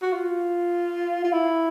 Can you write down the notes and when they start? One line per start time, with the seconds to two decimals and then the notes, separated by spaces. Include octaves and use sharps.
0.02 F#4
0.13 F4
1.24 F4
1.32 E4